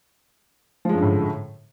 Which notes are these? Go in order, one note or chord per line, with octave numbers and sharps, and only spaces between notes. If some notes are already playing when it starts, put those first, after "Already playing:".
F#2 A2 D3 F3 G#3